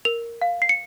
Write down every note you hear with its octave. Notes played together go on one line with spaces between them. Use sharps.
A#4 F7
F5
C7
C#7